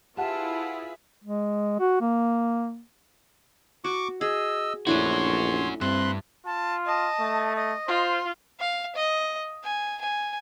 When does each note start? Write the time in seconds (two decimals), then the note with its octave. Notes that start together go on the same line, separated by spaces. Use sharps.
0.17 E4 F4 G4 G#4 B4 E5 F#5 A5
1.24 G#3
1.80 F#4
2.01 A#3
3.84 F#4 C#6 D6
4.21 G#4 D#5 E6
4.87 A#1 A3 C#4 D4 E4 F#4 C#5 C6
5.81 G2 C4 E5 C6 F#6
6.46 F4 A5
6.86 D#5 A5
7.20 A3
7.56 D#5
7.88 F4 C5
8.60 F5
8.96 D#5
9.64 G#5
10.01 G#5